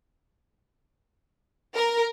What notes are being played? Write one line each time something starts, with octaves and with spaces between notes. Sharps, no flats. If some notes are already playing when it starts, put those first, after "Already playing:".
A#4